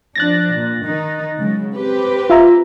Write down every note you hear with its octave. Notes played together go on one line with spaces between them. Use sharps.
F3 D4 F#6 A6 A#6
A#2
D#3 D#4
C#3 F#3 G#3
C4 G4 B4
F4 E5 A#5